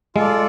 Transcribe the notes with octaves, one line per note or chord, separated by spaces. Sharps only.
G#3 F4 A4 D5